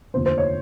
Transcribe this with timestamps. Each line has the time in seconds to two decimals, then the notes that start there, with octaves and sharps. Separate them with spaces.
0.14 F1 D#2 D3 F3 C5
0.26 C5
0.38 C#5